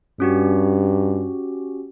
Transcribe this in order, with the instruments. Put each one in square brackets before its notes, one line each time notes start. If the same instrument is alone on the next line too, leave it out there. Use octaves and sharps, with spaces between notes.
[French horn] G2 [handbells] C#4 F#4 G4